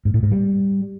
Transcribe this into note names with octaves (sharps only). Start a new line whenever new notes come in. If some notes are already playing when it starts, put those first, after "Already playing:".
G#2
A2
G#2
G3